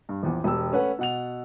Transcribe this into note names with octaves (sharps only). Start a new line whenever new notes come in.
G2
A#1 E2
E1 G4 E6
A3 C#4 B4 F#5
B2 F#5 F7